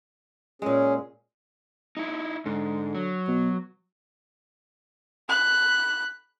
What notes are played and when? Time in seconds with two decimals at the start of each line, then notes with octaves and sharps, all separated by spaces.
0.62 A#2 G#3 C#4 G#4
1.97 D#4 E4
2.46 G#2 D3
2.95 F#3
3.28 B2
5.29 B5 F#6